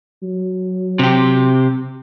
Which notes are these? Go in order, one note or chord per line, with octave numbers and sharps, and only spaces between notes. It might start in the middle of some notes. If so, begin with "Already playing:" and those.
F#3
C3 G4